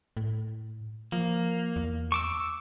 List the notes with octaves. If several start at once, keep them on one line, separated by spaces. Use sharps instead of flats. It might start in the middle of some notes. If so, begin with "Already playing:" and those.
A2
F3 A#3
E2
C#6 D6 E6